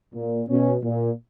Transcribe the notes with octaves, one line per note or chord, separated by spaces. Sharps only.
A#2
B2 C#4
A#2